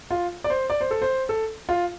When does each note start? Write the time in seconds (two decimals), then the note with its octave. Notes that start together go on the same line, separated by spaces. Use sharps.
0.11 F4
0.44 D5
0.50 C5
0.70 D5
0.81 C5
0.91 A4
1.02 C5
1.29 A4
1.69 F4